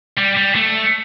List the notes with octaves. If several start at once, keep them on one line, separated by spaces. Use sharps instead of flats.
G3
G3
A3